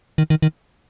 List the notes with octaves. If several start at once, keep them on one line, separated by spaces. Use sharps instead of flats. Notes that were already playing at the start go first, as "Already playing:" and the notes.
D#3
D#3
D#3